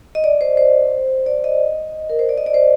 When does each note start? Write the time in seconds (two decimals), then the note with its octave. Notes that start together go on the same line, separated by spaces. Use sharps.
0.15 D#5
0.24 D5
0.41 C5
0.57 C5
1.26 D5
1.44 D#5
2.10 A#4
2.19 C5
2.29 D5
2.38 D#5
2.46 D5
2.54 C5